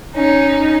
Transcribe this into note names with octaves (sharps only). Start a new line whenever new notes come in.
C#4 D#4